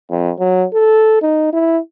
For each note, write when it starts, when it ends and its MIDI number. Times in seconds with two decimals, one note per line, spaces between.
0.10 0.31 41
0.39 0.66 54
0.74 1.18 69
1.22 1.51 63
1.53 1.79 64